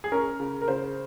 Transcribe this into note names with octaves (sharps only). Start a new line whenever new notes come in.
G#4
C#4 A#4
C#3
A#4
C#3 C5